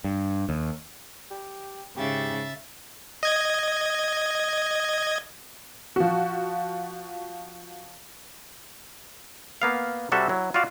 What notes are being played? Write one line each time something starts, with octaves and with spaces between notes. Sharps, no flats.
G2
D#2
G4
G#2 C#3 G4 E5 A6
D#5 G#6
F3 F#4
A#3 B3 F5
C3 G3 F#4 A4 E5 F#5
F#3 E4
F4 F#4 D5 F5